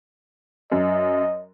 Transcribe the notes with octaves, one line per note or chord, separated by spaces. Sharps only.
F#2 D#5